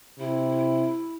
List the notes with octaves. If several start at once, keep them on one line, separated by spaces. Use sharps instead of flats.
C3 E4